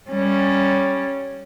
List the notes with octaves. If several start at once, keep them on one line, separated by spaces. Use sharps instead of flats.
G3 C#4